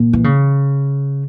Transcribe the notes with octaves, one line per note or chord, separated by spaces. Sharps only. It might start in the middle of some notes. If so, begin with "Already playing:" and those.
Already playing: A#2
E3
C#3